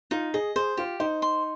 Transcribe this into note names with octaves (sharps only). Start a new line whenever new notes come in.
D#4 F4
G#4 D#5
G#4 C5
F4 G4
D#4 C5
C6